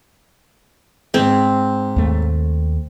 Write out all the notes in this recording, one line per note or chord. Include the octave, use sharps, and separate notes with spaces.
G#2 C4
D#2 A3